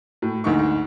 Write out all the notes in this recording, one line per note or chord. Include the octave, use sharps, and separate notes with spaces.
A2
D2 G#2 D#4 C#6